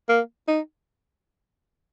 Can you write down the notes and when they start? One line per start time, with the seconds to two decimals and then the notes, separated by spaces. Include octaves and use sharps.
0.09 A#3
0.48 D#4